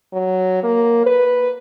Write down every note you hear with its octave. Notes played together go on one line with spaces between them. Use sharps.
F#3
A#3
B4